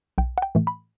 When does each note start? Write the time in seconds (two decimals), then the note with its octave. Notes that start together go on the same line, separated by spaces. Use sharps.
0.18 B1 G5
0.38 F#5
0.42 G5
0.55 A2 E3 A3
0.67 B5